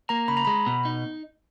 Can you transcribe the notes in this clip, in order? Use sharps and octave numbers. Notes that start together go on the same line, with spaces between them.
A#3 A#5
C#3 B5
A#5
G#3 B5
B2
D#4